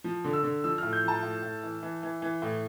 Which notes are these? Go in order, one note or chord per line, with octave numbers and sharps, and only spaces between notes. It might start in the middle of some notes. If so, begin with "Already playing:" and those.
F3
D3
E6
D3
F3 E6
A2 F6
G6
F3 A5
A2
A2
E3
E3
E3
E3
A2